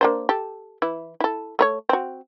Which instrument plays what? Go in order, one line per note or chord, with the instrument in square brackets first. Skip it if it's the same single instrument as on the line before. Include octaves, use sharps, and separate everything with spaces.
[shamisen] A#3 D4 C5
G4 A4
E3 E4
E4 A4
A3 A#4 C#5
C4 F#4